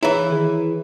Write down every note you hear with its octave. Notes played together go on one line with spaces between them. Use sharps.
E3 E4 G#4 C#5 A#5
D#3 G#4